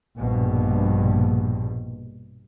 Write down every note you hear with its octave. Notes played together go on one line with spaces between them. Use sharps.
A#1 G2 B2